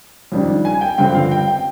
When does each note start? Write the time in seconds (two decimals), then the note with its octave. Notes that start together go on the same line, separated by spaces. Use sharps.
0.32 F2 D#3 G3 D4
0.65 G#5
0.81 G5
0.98 G2 D3 F3 C4 G5
1.15 F5
1.31 G5
1.48 G5